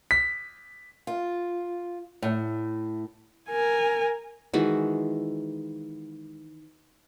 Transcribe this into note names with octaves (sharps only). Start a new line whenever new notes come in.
B6
F4
A2
A#4 G#5
D#3 E3 G#3 F#4